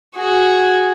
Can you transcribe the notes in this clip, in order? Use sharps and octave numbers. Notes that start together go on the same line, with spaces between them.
F#4 G#4